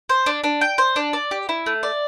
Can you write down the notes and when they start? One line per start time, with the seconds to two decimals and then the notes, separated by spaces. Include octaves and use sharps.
0.09 C5
0.26 D4
0.44 D4
0.61 G5
0.78 C5
0.96 D4
1.13 D5
1.31 G4
1.49 E4
1.66 A3
1.83 D5